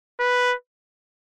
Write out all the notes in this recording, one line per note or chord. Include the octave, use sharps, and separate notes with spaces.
B4